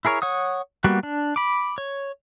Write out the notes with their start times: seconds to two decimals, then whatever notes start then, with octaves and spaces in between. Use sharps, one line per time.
0.05 E4 G#4 A#4 C#5
0.22 C#5 F#5 D#6
0.84 G3 A#3 B3 F#4
1.03 D4
1.36 B5 D6
1.78 C#5